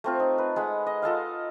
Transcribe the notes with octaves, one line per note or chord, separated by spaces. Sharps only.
A3 C4 F4
D#4
B4
G#3 F#5 B5
D#5
F4 A4 D#5 F5